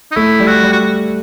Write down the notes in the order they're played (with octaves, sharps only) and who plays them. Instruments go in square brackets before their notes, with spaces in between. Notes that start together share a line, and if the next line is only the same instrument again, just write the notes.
[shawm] D#4
[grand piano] A3 [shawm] E4
[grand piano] G3
[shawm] F#4
[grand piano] G3
[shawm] F#4